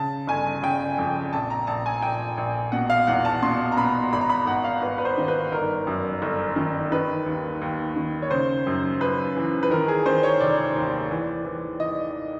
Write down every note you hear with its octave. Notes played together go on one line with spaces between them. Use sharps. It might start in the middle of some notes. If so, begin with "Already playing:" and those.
Already playing: C#3 A5
G1 G#5
C#3 G5
F2
A#1 A5
A#5
A#1 A5
G#5
A#1 G5
A#1
B2 F#5
F5
E2 F#5
A5
B2 C6
A#5
B2 B5
G#1 B5
A#5
B5
G#1 F#5
F5
G#1 B4
B4
C5
D#3
B4
G1 A#4
F#2
G1
D#3
D#3 B4
D#2
D#2
D#3
C#5
C#3 C5
F#2
F#2 B4
E3
B4
D#3 A#4
G#4
D#3 C5
C#5
F1 D5
D#2
E3
E3
D#5